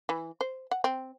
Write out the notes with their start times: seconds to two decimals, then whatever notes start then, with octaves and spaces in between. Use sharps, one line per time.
0.09 E3
0.41 C5
0.71 F#5
0.84 C4